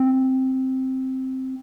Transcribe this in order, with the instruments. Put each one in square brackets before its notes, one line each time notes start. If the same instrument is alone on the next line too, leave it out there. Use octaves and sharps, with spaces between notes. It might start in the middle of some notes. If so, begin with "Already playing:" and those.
Already playing: [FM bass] C4